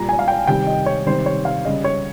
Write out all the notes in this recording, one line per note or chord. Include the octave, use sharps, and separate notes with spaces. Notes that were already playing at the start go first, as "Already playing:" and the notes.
Already playing: A#2 G3 A#5
G#5
F5
G5
C3 D#3 G3 G5
D#5
C#5
C3 D#3 G3 C5
C#5
F5
C#3 G3 D#5
C#5